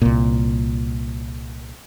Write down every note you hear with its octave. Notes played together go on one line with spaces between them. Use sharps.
C2 A#2